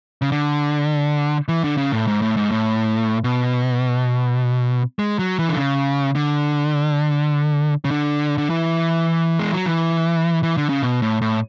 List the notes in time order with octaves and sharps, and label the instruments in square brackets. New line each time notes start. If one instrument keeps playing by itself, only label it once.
[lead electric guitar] C#3
D3
E3
D3
C#3
A2
G#2
A2
G#2
A2
B2
G#3
F#3
E3
D3
C#3
D3
C#3
D3
D3
E3
G#3
F#3
E3
E3
D3
C#3
B2
A2
A2